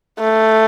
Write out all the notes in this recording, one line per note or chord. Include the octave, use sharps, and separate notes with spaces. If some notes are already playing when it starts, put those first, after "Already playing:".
A3